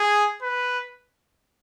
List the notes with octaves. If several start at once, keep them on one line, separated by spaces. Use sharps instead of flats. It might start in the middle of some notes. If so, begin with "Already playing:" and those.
Already playing: G#4
B4